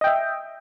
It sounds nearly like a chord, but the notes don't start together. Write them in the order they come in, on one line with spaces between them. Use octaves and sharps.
D#5 G5 E5